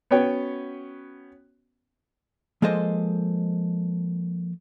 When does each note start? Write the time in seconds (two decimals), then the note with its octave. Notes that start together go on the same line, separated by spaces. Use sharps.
0.11 B3 C#4 F#4 B4 C#5 G5
2.62 F3 G#3 A#3 A4 C5 D#5